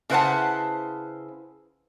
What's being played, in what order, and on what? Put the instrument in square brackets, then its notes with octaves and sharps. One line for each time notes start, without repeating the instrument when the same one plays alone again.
[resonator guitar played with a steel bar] C#3 E4 B4 C5 F#5 A5